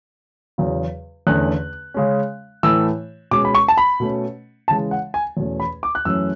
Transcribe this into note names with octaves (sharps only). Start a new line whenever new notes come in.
E2 C#3 F#3 C#4
E2 D3 A3 C#4 F#6
C#3 G#3 C#4
A2 E3 A3 E6
B2 G#3 C#4 D6
B5
C#6
A5
B5
B2 A3 C#4
C#3 E3 G#3 A5
F#5
G#5
E2 B2 A3 C#4
B5
D6
F#6
F#2 E3 A3 C#4 E6